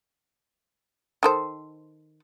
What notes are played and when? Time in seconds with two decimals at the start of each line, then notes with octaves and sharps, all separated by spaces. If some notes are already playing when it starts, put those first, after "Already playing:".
1.23 D#3 A4 C5